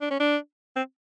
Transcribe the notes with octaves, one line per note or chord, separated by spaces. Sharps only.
D4
C#4
D4
C4